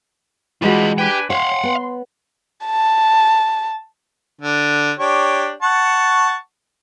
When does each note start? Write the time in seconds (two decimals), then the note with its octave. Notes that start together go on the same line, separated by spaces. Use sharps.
0.62 E3 G3 G#3 B3 F4 F#4 D#5 B5
0.98 D4 G4 B4 G5 G#5
1.30 C#5 F5 F#5 C6
1.63 B3
2.65 A5
4.41 D3
4.98 D4 G4 C#5
5.62 F#5 A5 C#6